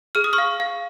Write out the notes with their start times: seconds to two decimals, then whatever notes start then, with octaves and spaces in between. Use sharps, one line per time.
0.15 G#4 F6
0.24 D#6
0.33 C#6 F6
0.38 F5
0.60 F5